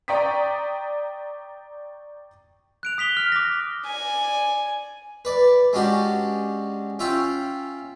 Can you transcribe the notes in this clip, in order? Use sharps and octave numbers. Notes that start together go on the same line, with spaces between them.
D5 G5 A#5 C#6 D#6 B6
F#6 D7 F7
D#6 B6 F7 G7
F6
D6 A#6
D5 G#5
B4 D5
G#3 C#4 D4 F#4 G4
C#4 F4 E5 G5